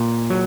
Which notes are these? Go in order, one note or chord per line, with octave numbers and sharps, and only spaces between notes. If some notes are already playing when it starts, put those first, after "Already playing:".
Already playing: A#2
F#3